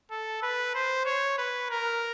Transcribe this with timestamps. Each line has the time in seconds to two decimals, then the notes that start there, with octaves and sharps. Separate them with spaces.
0.11 A4
0.42 B4
0.75 C5
1.05 C#5
1.38 B4
1.70 A#4